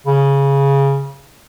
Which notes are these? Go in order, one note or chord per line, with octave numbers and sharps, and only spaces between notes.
C#3